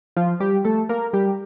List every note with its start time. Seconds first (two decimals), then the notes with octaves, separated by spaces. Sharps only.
0.16 F3 F4
0.40 G3 G4
0.65 A3 A4
0.89 A#3 A#4
1.13 G3 G4